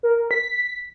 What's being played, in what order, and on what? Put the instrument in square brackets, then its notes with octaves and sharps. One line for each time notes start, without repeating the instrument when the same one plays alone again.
[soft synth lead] A#4
B6